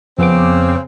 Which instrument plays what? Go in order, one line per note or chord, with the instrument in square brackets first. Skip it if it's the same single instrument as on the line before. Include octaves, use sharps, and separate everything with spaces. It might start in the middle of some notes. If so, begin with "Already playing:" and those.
[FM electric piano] F2 B3 D6 [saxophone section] C#3 C4